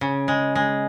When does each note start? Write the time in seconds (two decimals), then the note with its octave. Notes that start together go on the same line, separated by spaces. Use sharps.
0.01 C#3
0.28 G#3
0.55 G#3